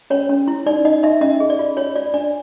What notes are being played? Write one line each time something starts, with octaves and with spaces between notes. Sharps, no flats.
C#4 C#5
C#4
E4
D#4 D5
D#4 D#5
D#4 E5
C#4 D#5
G#4
D5
F4
F4 C#5
F4 D5
D4 D5